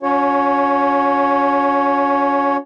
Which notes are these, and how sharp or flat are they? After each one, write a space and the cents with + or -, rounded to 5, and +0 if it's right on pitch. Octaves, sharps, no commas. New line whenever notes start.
C#4 +25 F#4 -45 C#5 +0